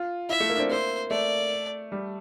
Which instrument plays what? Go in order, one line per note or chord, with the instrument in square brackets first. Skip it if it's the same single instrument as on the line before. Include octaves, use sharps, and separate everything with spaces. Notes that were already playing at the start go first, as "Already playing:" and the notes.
Already playing: [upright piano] F4
[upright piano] E4 [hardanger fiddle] E5
[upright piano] A3
A#3
D4
C4
[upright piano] A#3 [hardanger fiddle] C5
[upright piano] A3 [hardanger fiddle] D5
[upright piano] G3